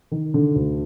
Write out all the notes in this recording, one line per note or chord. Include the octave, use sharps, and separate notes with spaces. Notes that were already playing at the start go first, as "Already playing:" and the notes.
D#3
D3
D2